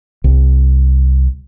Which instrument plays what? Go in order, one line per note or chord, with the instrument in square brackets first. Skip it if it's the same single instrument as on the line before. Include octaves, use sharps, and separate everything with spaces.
[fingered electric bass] C2